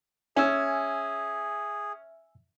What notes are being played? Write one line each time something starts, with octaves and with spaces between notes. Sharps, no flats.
C#4 G#4 E5 G#5 E6